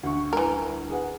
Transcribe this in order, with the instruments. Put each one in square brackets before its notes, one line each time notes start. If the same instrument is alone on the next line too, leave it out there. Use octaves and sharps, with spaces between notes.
[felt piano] D2 [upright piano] F#5 C#6
[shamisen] E3 A#4 [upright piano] G3 G#5 A#5
[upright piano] G#4 B4 F#5